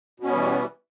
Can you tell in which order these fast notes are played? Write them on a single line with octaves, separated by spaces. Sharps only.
B2 C#4 B3 G3 E3